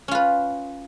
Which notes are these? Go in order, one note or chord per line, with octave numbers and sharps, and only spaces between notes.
C#4 F4 B4